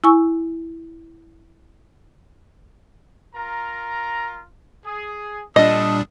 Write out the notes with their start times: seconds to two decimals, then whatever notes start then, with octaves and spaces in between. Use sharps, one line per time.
0.04 E4 G#5 C#6 E6
3.35 F4 A#4 A#5
4.86 G#4
5.56 A#2 G3 A3 D4 A4 D#5 D#6